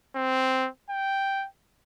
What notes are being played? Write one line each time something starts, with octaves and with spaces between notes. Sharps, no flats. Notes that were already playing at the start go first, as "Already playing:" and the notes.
C4
G5